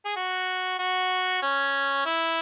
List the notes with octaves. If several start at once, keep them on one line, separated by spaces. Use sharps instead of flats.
G#4
F#4
F#4
C#4
E4